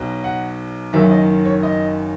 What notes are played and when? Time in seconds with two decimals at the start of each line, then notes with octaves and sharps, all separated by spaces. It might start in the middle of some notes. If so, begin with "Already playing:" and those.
Already playing: B1 B2 F#3
0.24 F#5
0.93 F#1 F#2 D#3 F#3 E5
1.11 D#5
1.45 C#5
1.63 D#5